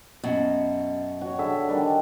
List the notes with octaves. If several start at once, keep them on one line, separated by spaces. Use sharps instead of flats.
F#2 B2
F#4 C#5
D3 G#4 E5
D#3 G3 D4